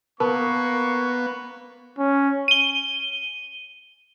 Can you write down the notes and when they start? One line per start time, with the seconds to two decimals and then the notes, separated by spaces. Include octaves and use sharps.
0.20 A#3 B3 A#4 B4 A5 C#6
1.98 C#4
2.48 D#7 G7